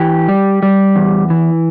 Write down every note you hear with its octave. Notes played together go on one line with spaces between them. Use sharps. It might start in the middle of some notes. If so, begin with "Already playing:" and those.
Already playing: E3 G4
G3
G3
E2
E3